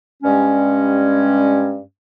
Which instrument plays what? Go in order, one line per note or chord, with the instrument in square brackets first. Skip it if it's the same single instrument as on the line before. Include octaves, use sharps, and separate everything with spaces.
[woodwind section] G2 G3 G#3 C#4